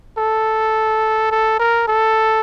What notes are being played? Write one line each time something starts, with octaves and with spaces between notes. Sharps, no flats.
A4
A4
A#4
A4